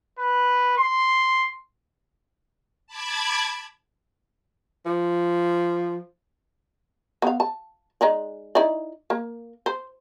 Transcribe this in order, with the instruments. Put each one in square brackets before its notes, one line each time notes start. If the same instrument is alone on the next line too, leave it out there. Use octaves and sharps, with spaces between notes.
[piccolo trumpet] B4
C6
[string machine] A5 B5 D6 G#6
[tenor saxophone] F3
[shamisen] B3 F5
A5
G#3 D#4 D5
D#4 E4 D5
A#3
C5